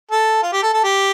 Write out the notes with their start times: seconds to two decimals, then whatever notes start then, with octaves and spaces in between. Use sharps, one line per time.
0.11 A4
0.42 F4
0.53 G4
0.62 A4
0.73 A4
0.84 G4